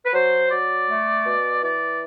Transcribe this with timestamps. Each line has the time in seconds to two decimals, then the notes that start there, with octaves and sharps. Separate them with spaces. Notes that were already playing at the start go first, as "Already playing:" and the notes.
0.05 B4
0.13 F#3 C5
0.50 F#3 D5
0.88 A3
1.25 B2
1.63 E3 D5